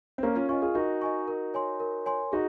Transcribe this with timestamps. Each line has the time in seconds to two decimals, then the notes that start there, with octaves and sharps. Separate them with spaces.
0.18 C4
0.22 A#3 C#4 A#4
0.35 C#4 F4
0.49 C#4 F4 D#5 G#5 C#6
0.62 F4 G#4
0.75 D#4 F#4 A#4
1.02 D#5 G#5 C#6
1.28 A#4
1.54 C#5 G#5 C6
1.80 A#4
2.06 C#5 G#5 C6
2.32 D#4 F#4 G#4